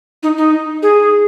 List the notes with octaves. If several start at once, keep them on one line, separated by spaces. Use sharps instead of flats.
D#4
D#4
G#4